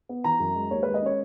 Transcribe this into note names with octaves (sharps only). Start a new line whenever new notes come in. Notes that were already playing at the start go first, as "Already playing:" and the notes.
B3
E3 A#5
F#2
G#3
D#2 C#5
G#3 B4
D#5
C#4 C#5